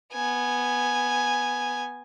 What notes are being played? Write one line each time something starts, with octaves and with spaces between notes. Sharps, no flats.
B3 G#5